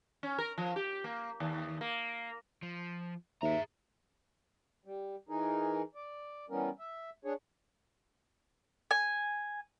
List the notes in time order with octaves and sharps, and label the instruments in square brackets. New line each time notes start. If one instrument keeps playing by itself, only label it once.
[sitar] C#4
A#4
F3
G4
A#3
D#2
A#3
[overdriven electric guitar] F3
[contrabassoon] D#2 [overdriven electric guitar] G#4 A#5 [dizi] E5
[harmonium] G3
E3 D#4 G#4 A#4
D5
E3 G3 B3 C#4 A#4
E5
D4 G#4 C#5
[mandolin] G#5